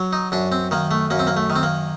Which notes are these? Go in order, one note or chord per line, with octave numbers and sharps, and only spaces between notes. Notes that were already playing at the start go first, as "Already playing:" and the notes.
Already playing: F#3
D#4
F#2 D4
C4
D#3 A#3
A3
F#2 A#3
C4
A#3
A3
D#3
C4
A#3